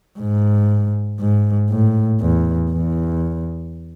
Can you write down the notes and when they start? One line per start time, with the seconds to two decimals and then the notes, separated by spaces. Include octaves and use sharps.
0.19 G#2
1.20 G#2
1.70 A2
2.21 E2
2.71 E2